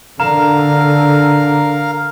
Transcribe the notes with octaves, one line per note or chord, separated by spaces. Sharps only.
D3 A#4 F5 A#5